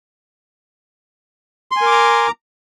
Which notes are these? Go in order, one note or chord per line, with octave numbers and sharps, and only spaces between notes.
A#4 G#5 A#5 C6 D6